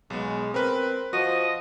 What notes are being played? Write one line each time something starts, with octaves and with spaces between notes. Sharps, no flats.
B1 G#3 B3
C4 A#4 B4
F3 F#4 D#5